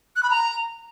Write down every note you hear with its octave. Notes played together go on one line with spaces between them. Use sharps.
F#6
B5
A#5